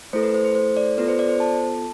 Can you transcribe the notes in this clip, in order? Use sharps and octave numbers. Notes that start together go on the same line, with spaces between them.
A3 E4 A4 C5
B4
C5
C5
C5
D5
B3 F4 A4 B4
C5
D5
C5
A5